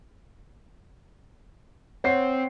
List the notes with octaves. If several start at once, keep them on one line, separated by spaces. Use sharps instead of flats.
C4 C#5 F#5 C7